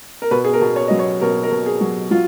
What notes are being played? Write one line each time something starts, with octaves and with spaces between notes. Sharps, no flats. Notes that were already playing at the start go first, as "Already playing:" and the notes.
A#4
B2 B4
G#4
A#4
B2
C#5
F#3 D#5
C#5
B2 A#4
A#4
B2
G#4
F#3
F#3 F4